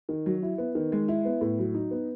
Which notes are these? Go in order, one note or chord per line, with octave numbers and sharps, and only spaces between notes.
D#3
F#3
E4
B3
D#3
G#3
E4
B3
A2
F#3
D#4
B3